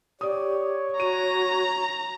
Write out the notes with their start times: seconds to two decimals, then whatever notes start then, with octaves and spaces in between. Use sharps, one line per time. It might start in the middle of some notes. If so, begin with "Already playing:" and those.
0.21 G4 C#5 D5 D#6
1.00 F#4 A#5 D#7